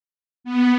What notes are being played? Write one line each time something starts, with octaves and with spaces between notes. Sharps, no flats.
B3